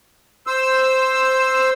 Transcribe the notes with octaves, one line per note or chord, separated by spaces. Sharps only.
C5 E6